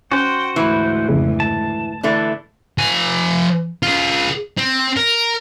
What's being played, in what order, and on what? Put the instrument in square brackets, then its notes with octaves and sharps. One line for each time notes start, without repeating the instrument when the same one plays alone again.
[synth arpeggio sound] C#4 [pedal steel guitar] F#4 C5 [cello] G5
[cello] D2 G#2 [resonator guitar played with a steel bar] E3
[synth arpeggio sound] F2 C#3
[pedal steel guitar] A5
[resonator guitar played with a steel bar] D3 E3 A3
[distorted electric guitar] F3 G#5
F4 G#4
C4
A#4